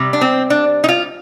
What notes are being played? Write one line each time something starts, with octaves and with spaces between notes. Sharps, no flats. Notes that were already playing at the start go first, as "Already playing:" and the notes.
Already playing: C3 G3
D4
C4
D4
D#4
F4